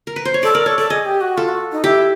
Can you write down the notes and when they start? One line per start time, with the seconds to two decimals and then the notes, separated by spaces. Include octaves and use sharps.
0.07 A#4
0.16 B4
0.25 C5
0.34 C#5
0.43 A4 D5
0.54 A#4 D5
0.66 A4 C#5
0.78 A4 D5
0.90 G#4 D#5
1.06 G4
1.21 F#4
1.37 F4 A4
1.48 F#4
1.72 D#4
1.84 E4 G4